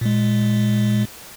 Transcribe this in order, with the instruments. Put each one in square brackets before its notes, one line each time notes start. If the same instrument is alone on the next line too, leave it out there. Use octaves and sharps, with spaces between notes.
[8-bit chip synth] A#2 G#3